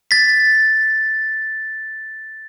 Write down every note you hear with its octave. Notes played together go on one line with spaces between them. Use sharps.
A6 B6